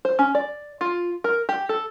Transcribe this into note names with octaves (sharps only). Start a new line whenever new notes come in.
C5
C#4
D5
F4
A#4
G4
A4